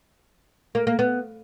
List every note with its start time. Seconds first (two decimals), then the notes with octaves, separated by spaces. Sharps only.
0.75 A#3
0.87 A#3
0.99 B3